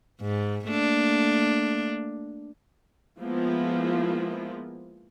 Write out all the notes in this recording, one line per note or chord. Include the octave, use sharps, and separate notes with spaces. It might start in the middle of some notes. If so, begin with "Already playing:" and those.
G#2
A3 A#3 D4
F3 G#3 A#3 B3 E4 F4